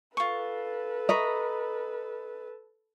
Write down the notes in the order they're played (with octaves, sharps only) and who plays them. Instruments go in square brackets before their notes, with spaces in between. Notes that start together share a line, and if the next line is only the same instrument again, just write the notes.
[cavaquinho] F4 C#6 [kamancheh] A4 B4
[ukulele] D#5 [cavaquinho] A#5 B5 C#6